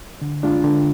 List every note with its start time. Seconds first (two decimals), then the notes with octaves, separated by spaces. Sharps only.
0.22 D3
0.43 G#3 D4 F4
0.64 D3